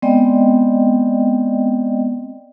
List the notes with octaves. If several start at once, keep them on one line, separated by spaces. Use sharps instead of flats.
G#3 B3 C4 D5 D#5 G5